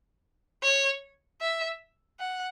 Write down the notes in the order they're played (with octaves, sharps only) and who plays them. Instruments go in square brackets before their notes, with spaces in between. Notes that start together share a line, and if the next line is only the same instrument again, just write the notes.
[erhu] C#5
E5
F#5